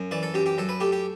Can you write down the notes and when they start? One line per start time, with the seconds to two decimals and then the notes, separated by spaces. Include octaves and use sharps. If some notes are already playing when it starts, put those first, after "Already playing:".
Already playing: F#2
0.11 E3 D5
0.23 A4
0.34 F#2 G4
0.46 G4
0.58 F#2 A4
0.69 B4
0.80 A3 G4
0.92 G4